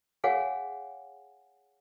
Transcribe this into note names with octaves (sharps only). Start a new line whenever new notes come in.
G#4 C#5 F5 F#5 G#5